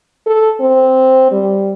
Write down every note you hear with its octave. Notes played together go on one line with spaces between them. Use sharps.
A4
C4
G3